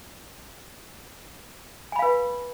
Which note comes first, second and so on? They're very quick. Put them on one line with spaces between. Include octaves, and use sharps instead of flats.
G#5 B5 F5 B4